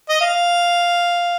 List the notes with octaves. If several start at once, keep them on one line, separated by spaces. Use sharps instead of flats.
D#5
F5